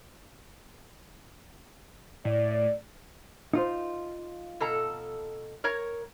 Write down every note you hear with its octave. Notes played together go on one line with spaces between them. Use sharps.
A2 D5
D#4 F4 C5
B2 A4 A#5
A#4 C#5 A#5